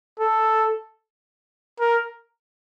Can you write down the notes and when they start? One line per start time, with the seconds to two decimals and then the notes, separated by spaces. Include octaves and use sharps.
0.19 A4
1.80 A#4